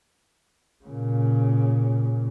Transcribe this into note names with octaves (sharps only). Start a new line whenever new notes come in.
A#2 C#3